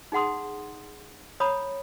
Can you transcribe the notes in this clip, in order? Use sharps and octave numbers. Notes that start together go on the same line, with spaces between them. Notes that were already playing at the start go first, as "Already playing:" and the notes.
D#4 G#4 F#5 C6 D#6
C#5 A#5 B5 D#6